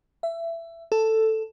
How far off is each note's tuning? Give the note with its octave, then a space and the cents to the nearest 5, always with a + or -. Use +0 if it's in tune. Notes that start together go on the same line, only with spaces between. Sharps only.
E5 +20
A4 +5